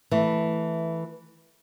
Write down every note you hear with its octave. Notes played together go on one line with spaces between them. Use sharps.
E3 A3